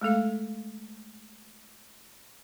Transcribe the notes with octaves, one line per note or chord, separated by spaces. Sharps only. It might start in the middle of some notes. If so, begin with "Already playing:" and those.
G#3 A3 A4 F5